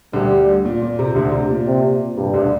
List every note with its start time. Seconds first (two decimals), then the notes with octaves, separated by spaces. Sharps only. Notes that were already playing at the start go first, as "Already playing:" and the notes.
0.13 D2 D3 G3
0.65 A#2
0.82 A#2
0.99 C3
1.15 D2 D3
1.32 C3
1.50 A#2
1.66 C3
2.17 G2 C3
2.33 D2 D3